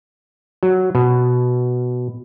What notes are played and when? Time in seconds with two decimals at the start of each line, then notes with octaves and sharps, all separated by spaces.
0.63 F#3
0.95 B2